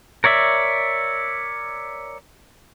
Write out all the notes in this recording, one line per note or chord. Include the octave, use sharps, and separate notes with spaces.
A#4 C#5 D5 E5